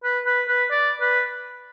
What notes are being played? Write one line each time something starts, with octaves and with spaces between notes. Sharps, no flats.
B4
B4
B4
D5
B4